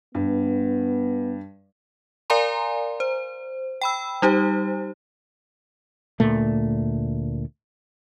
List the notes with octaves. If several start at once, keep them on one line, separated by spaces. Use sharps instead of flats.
G2 B3
A#4 D5 F5 G#5 A#5 C6
C5
G5 B5 E6
G3 D#4 G4 C5
D2 A#2 A3